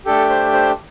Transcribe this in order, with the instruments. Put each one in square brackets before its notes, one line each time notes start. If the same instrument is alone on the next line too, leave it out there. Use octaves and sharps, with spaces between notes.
[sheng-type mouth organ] A3 D4 G4 A4
C5
C5